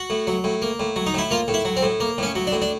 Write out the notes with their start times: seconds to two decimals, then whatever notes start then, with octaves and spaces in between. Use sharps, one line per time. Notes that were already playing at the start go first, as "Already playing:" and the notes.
Already playing: F#4
0.10 A2
0.27 F#3
0.44 A2
0.62 A#3
0.79 A2
0.96 F#3
1.06 D#4
1.14 A2 E4
1.31 A#3 F4
1.48 A2
1.54 E4
1.65 F#3
1.77 C4
1.83 A2
2.00 A#3
2.18 A2 C#4
2.35 F#3
2.47 D4
2.52 A2
2.62 D4